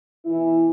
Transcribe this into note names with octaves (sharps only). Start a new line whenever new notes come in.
B2 E3 E4